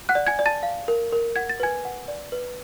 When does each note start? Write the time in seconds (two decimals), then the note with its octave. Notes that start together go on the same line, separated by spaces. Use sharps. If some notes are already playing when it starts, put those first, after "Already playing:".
0.09 F#5 F#6
0.15 D5
0.27 G#5 G#6
0.39 D5
0.46 A5 A6
0.63 F5
0.88 A#4
1.12 A#4
1.36 F#5 G#6
1.50 A6
1.60 B4 G#5 G#6
1.85 F#5
2.08 D5
2.32 B4